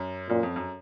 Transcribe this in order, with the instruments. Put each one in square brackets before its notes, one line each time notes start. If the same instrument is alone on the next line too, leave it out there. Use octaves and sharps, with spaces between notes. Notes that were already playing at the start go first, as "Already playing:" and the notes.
Already playing: [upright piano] F#2
[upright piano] F#2 [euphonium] A#2
[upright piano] F2
F#2